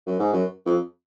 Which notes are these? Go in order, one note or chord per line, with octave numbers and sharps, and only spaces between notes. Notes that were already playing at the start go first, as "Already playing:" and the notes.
F#2
G#2
F#2
F2